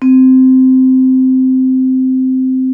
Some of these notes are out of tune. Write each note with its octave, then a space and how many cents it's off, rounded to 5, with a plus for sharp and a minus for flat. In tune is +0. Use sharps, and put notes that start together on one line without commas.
C4 -10